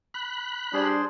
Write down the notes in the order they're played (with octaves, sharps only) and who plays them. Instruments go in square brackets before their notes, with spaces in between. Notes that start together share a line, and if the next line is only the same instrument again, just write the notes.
[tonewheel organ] B5 F#6
[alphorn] G3 [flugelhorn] D4 [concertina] G#4 C5 C6